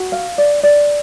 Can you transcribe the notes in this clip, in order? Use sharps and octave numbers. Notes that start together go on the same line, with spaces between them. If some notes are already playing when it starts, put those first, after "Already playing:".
Already playing: F#4
F5
D5
D5